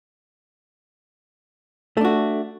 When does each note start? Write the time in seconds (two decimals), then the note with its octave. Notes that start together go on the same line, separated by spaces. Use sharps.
1.97 A3
2.01 D4
2.04 F#4